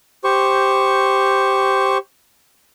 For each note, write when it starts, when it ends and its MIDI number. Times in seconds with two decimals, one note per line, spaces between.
0.24 1.98 67
0.24 1.98 72
0.24 1.98 85